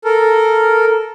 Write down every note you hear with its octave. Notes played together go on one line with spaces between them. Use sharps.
A4 A#4